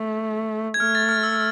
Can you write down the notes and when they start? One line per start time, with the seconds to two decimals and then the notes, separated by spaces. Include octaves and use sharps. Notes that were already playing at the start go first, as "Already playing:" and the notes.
Already playing: A3
0.74 G#6
0.80 A3 F6
0.95 A6
1.09 F6
1.23 E6